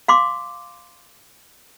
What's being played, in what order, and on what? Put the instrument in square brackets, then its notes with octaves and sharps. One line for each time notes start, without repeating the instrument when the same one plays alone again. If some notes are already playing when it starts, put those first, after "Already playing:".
[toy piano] F5 C6 D6